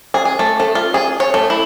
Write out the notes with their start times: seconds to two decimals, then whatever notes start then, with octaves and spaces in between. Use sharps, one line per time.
0.14 G#4
0.25 G#4
0.39 A3
0.60 A3
0.75 F4
0.94 G#4
1.20 C#5
1.34 A3
1.50 E4